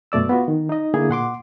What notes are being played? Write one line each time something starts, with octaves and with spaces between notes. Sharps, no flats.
F#2 B2 A3 D5 E6
B3 F4 F#4
D#3
D#4 D#5
D3 A#3 E4 G#4
A#2 F#5 C6 D6